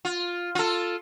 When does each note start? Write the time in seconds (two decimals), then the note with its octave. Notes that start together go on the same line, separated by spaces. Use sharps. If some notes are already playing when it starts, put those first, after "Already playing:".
0.05 F4
0.55 F4 A4